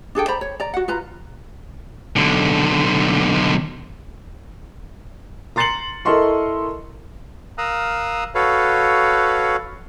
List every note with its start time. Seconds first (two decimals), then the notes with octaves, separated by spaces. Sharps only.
0.15 D4 G#4 A4 G5
0.28 C5 D5 A#5 B5
0.41 C#5
0.60 D5 A#5
0.74 F#4 F#5
0.88 F4 B4 A#5
2.16 B1 D3
5.56 A#5 C6 A6 C7 C#7 F#7
6.05 E4 A4 A#4 D#5 C6 C#6
7.58 A#4 F5 A#5 D#6 E6 F#6
8.35 F#4 A4 B4 C#5 F5